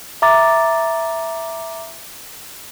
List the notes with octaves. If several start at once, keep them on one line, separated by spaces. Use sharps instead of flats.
E5 A#5 D6 A6